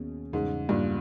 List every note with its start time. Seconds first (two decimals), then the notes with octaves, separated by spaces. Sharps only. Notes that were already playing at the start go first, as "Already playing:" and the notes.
Already playing: D#2 B2 D#3 A#3 C#4 G#4
0.33 E2 G#2 C#3 G3 C#4
0.69 G2 A#2